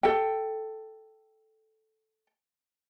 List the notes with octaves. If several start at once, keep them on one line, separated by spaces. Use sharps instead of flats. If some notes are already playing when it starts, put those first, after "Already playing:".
A4 G5